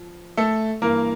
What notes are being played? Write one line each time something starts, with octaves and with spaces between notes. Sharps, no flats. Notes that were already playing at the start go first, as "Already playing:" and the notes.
Already playing: F3
A3 A4
G2 E3 A#3 A#4